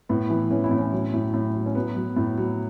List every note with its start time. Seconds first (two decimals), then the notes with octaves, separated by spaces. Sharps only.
0.09 A2 B3
0.30 E3
0.50 E3 C#4
0.64 E4
0.71 A2
0.79 C#4
0.92 F#3
1.14 A2
1.34 A2
1.54 F#3
1.66 C#4
1.75 F#3 B3
1.96 F#3
2.16 A2
2.38 F#3